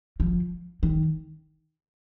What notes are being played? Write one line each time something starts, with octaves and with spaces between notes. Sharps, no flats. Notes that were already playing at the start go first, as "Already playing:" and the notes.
F3
D#3